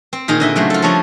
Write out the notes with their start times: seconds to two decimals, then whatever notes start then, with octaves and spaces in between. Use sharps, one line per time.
0.13 C4
0.28 A#2 D#3 D#4 G#4 A#4
0.40 D3 D#5 E5
0.56 C#3 F#3 A3 C5
0.70 F4 A4
0.82 F3 G3 D4 A4 C#5 D#5